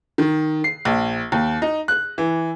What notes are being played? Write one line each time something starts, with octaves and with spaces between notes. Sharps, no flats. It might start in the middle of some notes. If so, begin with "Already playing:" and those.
D#3
C7
A#1
D#2
D#4
F#6
E3